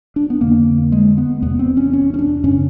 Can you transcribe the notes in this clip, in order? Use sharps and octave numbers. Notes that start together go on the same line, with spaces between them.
D4
B3
F2 D3 A#3
G#3
B3
E2 C3 B3
C4
C#4
C#4
C#4
D4
F#2 C#3 C#4